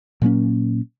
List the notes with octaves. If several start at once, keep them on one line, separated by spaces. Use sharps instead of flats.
A#2 F#3 A#3 C#4